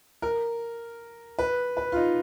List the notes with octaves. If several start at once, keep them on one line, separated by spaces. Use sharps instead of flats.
A#4
B4
B4
F4
D#4